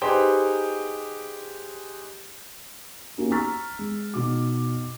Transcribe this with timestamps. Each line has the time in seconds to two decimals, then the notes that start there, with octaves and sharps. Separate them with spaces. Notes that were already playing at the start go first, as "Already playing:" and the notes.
0.02 D#4 G4 G#4 B4 C5 G5
3.17 A#3 B3 C#4 D#4 F#4 G4
3.31 A#5 C#6 E6 F6 A6 B6
3.79 G#3
4.14 B2 D#4 F#4 D6